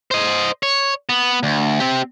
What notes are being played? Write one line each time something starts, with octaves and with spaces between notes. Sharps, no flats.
C5 D#5
C#5
B3
D2
C4 G4